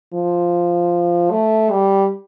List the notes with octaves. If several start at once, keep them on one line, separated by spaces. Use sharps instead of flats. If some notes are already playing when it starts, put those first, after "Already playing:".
F3
A3
G3